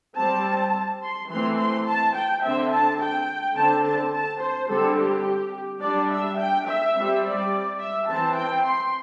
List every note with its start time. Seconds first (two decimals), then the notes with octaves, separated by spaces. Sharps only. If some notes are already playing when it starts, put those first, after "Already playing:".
0.17 G3 C4 A5
1.03 C6
1.30 E3 A3 C4 C6
1.59 C6
1.86 A5
2.15 G5
2.43 D3 C4 E5
2.71 A5
3.00 G5
3.56 D3 C4 A5
3.85 A5
4.13 A5
4.40 C5
4.69 D3 G3 C4 A4
4.97 G4
5.81 G3 D4 D5
6.11 E5
6.38 G5
6.67 E5
6.94 G3 C4
7.24 D5
7.79 E5
8.08 E3 C4 A5
8.35 G5
8.64 C6